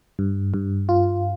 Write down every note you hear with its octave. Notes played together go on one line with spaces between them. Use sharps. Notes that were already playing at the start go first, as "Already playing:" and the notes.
G2
G2
F4